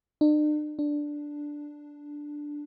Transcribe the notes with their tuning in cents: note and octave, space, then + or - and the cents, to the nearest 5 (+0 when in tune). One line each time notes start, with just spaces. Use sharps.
D4 +45
D4 +0